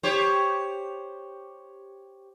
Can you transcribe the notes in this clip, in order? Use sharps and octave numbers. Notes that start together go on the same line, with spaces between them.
G4 C5 C#5